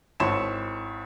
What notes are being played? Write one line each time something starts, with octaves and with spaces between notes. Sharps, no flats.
G#1 E4 C#5 A5 C6 E7